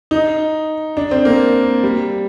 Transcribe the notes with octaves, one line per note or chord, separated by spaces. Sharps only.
D#4
D4
C4
A#3
G3